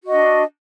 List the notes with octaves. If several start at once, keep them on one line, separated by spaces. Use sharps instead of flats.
D4 F#4 D#5